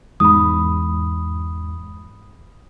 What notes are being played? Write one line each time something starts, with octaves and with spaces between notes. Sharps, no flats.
E2 G#2 B5 D#6